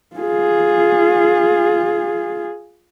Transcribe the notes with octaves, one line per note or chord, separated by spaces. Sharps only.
F4 G#4